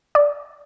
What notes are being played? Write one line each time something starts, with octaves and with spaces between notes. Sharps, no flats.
D5